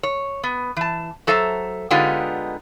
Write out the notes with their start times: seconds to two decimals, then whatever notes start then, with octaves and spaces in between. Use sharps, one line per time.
0.03 C#5
0.43 B3
0.76 E3 A5
1.27 F#3 A4 C5 E5 G#5 A#5
1.90 D3 G#3 B3 D#4 F4 G4